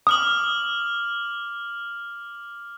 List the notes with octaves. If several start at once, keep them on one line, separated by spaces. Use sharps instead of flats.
D6 D#6 F6 F#7